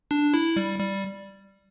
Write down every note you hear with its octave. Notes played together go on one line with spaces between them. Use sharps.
D4
E4
G3
G3